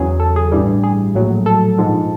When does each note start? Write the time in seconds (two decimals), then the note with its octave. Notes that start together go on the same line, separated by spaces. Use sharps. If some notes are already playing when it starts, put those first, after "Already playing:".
Already playing: E2 C#3 F#3 G#4
0.20 A4
0.36 G#4
0.52 A1 G2 E3 G3
0.84 G#4
1.14 A#1 A2 F#3
1.46 A4
1.78 A#1 G#2 F3 G#3